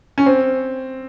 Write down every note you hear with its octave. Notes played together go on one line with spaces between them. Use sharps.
C#4
C4